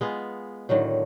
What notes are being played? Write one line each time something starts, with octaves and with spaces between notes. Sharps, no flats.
G#3 B3 F4
A2 D3 D#3 F#3